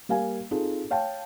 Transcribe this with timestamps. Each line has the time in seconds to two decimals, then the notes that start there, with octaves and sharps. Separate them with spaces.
0.09 G3 A#3 F5 G#5
0.51 C4 D#4 F4 G#4 A4
0.90 C#5 F5 G5 A5